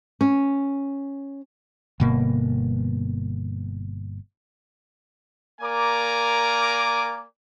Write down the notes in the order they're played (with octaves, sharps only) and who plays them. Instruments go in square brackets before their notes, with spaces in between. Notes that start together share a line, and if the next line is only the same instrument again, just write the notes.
[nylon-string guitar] C#4
[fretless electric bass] G1 B2 A#3
[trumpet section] A#3 A#4 D5 G#5 A#5 D6